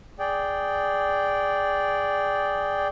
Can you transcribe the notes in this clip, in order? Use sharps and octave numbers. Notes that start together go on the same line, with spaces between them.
G#4 D5 G5